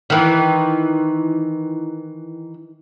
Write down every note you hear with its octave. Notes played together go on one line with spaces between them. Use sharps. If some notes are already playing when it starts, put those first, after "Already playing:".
D#3 E3